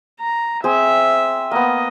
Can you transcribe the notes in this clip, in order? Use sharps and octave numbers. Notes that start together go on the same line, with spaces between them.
A#5
C4 G#4 C5 E5
A#3 B3 D#5